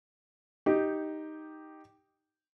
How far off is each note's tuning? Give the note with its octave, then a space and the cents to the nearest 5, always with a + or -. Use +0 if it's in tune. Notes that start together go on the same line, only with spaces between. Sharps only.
D#4 +0 G4 +0